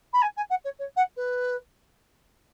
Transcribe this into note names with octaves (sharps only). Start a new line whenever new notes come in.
B5
G#5
G#5
F#5
C#5
C#5
F#5
B4